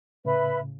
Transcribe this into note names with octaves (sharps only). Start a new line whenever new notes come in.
A2 C#3 B4 E5 B5